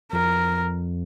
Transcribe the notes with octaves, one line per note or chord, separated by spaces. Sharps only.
F2 A#4